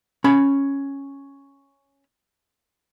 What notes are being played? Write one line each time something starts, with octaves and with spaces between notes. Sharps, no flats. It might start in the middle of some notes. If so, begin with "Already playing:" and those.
C#4 B5